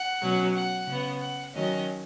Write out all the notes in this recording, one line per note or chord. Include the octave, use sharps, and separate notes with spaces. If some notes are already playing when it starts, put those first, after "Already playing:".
Already playing: F#5
B2 F#3 C#4
F#5
C#3 B3
F#5
D#3 F#3 C#4 D#5